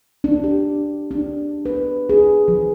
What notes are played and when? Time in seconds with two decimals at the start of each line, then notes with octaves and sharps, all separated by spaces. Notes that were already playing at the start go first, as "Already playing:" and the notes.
0.24 D4
0.44 G4
1.11 D4
1.65 B4
2.09 G#4
2.48 F3